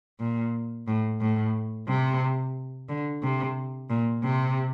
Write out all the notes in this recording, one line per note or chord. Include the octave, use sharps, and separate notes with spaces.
A#2
A2
A2
C3
D3
C3
A#2
C3